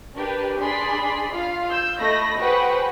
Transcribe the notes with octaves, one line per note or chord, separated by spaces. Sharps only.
D4 G4 A#4 B4
D4 G#4 D5 B5 C6 B6
F4 F5
E6 G6
A3 D#5 B5 A#6
F#4 G#4 B4 C5 F#5 G5